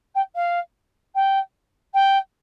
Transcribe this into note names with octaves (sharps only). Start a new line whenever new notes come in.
G5
F5
G5
G5